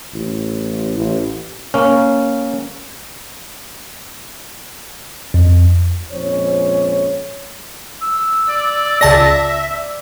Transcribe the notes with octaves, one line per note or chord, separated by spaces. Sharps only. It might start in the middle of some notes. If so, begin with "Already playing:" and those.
A1
A1
A#3 C#4
F2
A#1 F2 G#3 C#4 C5 C#5
E6
D5
C#2 D5 E5 A5 A#6